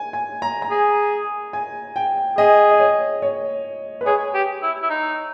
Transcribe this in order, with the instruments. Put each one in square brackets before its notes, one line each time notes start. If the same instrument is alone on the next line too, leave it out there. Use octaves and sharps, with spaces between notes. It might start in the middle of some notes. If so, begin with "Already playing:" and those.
Already playing: [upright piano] G#5
G#5
A#5
A#5
[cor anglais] G#4
[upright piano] G#5
G5
[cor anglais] G#4 [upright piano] D#5
[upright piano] D#5
C#5
C#5
B4
[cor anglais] G#4 [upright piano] C#5
[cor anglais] G4
E4
E4
D#4